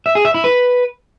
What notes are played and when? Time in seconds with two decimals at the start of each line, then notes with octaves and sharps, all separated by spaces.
0.06 E5
0.15 G#4
0.25 E5
0.34 E4
0.44 B4